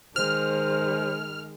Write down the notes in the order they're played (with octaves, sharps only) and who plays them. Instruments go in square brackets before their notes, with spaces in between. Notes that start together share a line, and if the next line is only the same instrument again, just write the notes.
[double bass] D#3 [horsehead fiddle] G#3 [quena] C5 [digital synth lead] F6